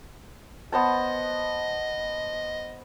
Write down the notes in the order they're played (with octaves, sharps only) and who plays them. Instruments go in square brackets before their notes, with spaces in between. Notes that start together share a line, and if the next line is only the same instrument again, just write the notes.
[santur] B3 C5 A5 [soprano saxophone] D#5